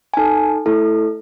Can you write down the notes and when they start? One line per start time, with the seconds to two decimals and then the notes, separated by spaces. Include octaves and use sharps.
0.14 G#5
0.17 D#4 A4 A5
0.66 A3 E4 A4